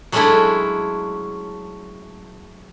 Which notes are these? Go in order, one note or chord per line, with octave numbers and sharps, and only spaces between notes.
F#3 G#3 A3 C#4 D4 E4